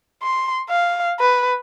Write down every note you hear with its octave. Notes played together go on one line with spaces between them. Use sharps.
C6
F5
B4